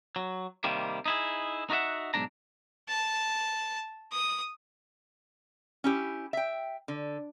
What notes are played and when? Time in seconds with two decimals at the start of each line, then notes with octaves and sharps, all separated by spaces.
0.16 F#3
0.64 C3 D#3 G3 A#3
1.06 D#4 E4 G#4
1.70 D#4 F#4 A#4 E5 F#5
2.14 B1 G#2 D4 A#5
2.89 A5
4.12 D#6
5.84 C#4 E4 G4
6.33 E5 G5
6.88 D3